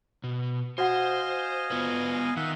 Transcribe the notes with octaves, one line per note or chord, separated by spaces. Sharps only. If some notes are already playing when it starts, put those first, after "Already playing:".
B2
F#4 C5 D#5 F5 F#5 G#5
B3 F4 B4
D#3 E5 F#5